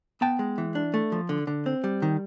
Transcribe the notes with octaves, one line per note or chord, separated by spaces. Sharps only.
B3 G5 A5
G#3
E3
D4
A3
F3
D3
D3
C4
G3
D#3